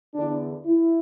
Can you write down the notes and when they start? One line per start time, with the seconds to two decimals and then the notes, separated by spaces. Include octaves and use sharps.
0.13 E2 D3 D4
0.64 E4